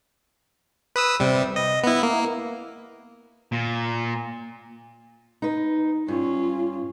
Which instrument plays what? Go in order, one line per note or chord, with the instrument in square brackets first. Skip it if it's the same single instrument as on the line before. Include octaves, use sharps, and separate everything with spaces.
[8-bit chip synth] B4 D#6 E6
C3 G3
D#5
B3 E4
A#3
[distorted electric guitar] A#2
[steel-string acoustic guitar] D#4 B4
[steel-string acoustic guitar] G2 [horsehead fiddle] C#4 F4